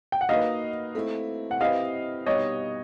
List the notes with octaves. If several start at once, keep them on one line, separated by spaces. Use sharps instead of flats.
G5
F#5
A#3 D#4 F#4 B4 D#5 F5
A3 C4 E4
F#5
C4 E4 G4 B4 D#5 F5
B2 G3 B3 D#4 G4 C#5 D#5